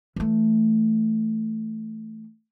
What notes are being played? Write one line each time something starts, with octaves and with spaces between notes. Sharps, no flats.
E3 A3